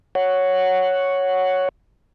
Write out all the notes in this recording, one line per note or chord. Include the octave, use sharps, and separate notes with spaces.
C#5 F#5